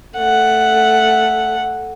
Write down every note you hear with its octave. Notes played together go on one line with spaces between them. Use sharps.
A3 F#5